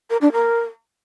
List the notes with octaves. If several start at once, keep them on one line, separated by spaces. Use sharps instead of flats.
A#4
D4
A#4